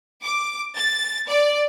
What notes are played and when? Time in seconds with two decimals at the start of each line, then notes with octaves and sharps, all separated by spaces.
0.23 D6
0.77 A6
1.29 D5